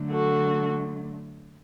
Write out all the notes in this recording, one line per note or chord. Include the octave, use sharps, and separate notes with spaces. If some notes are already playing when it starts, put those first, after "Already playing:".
Already playing: D3 F#3 A3
F#4 A4